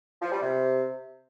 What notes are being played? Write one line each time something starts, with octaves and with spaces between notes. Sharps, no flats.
F3
G3
C3